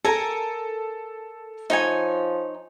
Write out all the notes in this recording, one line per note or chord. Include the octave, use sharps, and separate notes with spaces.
A4 A#4 G#5 A#5
F3 D#4 C#5 G#5